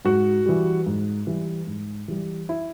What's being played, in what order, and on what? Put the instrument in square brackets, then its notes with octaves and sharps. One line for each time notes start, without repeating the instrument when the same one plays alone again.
[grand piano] G#2 F#4
E3 G3
G#2
E3 G3
G#2
E3 G3
E4